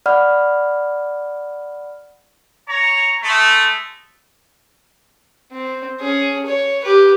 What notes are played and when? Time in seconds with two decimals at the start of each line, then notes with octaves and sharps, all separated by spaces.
0.06 D5 F#5 B5 F6
2.69 C#5 A#5
3.23 G#3 A3
5.52 C4
6.00 C#4 G#4
6.46 C#5
6.84 G4 B4